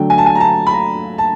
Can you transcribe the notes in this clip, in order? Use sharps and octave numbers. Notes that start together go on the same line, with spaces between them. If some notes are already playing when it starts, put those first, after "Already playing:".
Already playing: D3 F#3 A3 G5
G#5
A5
G#5
A#5
A5
B5
A#5
A5